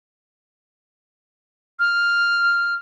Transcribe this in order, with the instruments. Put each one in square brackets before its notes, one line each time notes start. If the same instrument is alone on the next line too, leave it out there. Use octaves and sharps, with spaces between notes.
[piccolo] F6